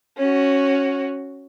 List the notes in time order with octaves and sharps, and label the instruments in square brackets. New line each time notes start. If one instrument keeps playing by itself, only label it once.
[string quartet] C#4 F#4